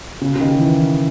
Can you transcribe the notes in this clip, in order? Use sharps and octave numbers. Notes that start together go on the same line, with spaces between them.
C#3
C#3
D#3
E3